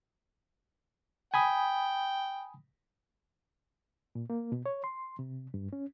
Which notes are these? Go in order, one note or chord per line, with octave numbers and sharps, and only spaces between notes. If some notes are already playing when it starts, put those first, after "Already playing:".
G5 G#5 B5 D#6
A#2
A#3
B2
C#5
C6
C3
G2
C#4